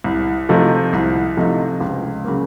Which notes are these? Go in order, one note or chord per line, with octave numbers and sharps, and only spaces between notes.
C2
C3 F3 A3 D#4
C2
C3 F3 A3 D#4
C#2
C#3 F#3 A#3